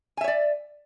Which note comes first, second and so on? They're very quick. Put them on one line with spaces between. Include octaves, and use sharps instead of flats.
G#5 E5 C#5 D5